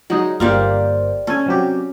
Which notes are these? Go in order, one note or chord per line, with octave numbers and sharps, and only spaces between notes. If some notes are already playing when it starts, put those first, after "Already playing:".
F#3 G#3 D#4
G1 A#3 G4 C5 D5 F5
C#4 A4 G#5
C3 F#3 G4